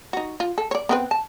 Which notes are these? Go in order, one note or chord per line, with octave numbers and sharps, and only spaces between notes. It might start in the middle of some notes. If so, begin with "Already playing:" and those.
D#4 F#4
F4
A4
C#5 D5
B3 C4 B4
A5